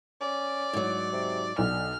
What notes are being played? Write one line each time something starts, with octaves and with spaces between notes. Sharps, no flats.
C#4 D5
G#2 F#3
C3
B1 D3 F6